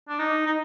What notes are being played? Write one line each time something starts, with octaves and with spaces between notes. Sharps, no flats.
D4
D#4
D#4